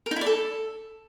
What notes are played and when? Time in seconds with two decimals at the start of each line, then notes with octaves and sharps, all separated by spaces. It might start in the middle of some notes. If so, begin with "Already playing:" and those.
0.06 A#4
0.11 D#4
0.16 E4
0.21 D5
0.26 A4